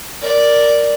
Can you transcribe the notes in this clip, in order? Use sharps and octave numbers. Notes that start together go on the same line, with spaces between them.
A#4 D5